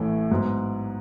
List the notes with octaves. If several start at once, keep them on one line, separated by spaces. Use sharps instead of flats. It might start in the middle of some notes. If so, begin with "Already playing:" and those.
Already playing: A1 A2 E3 A3
G#2 F#3 B3